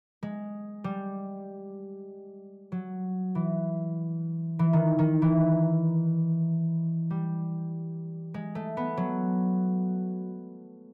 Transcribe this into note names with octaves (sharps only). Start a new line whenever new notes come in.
G#3
G3
F#3
E3
E3
D#3
D#3
E3
G3
G#3
A3
B3
F#3